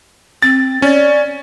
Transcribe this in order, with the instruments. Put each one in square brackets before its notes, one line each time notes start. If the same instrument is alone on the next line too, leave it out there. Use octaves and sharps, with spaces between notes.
[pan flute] C4 [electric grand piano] A6
[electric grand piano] C#4 [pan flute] D5